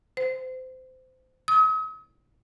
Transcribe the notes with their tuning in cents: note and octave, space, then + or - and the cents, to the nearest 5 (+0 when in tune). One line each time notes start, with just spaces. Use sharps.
C5 -25
D#6 +45